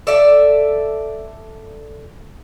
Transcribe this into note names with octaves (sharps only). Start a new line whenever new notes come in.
A4 D5 E5